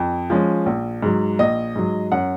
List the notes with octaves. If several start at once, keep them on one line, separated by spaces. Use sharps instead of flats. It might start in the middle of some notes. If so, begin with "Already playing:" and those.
Already playing: F2
F3 G#3 C#4
A#1
G#2 F#3
A#1 D#5
G#2 F#3
F#2 F#5